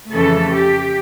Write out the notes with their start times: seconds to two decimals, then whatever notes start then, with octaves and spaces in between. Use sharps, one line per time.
0.12 F2 C#3 E3 A3 A4
0.51 G4